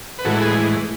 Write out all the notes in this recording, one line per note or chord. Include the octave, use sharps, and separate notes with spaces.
B4
A2 E3 G#3 F#4 A4
G#4 B4